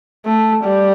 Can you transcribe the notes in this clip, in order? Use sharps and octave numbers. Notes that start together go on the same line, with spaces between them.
A3
G3